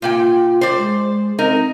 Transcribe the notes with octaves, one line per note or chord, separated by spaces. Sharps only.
A#2 A#3 F4 G5
C5 D5
G#3
C4 D#4 A#4